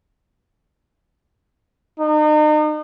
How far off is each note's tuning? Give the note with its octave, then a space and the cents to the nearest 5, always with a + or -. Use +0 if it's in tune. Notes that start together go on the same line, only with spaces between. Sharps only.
D#4 -40